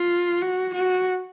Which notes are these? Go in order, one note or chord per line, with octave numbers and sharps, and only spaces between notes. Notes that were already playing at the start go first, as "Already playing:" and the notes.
Already playing: F4
F#4
F#4